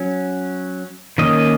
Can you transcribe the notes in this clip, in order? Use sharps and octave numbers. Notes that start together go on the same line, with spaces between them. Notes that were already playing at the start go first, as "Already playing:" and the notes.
Already playing: F#3 C#4
D#3 A#3 C#4 D#5